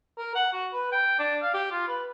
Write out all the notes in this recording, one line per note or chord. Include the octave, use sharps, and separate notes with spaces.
A#4
F#5
F#4
B4
G5
D4
F5
G4
F4
B4